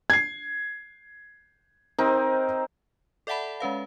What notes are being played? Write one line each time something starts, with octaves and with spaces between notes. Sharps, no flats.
G#6 C7
C4 D#4 A#4
A4 D5 E5 F#5 A5 B5
G#3 C#4 B4 F5